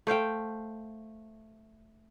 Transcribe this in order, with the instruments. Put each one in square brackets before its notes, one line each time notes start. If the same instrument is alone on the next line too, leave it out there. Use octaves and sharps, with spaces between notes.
[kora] A3 C5 F5 G5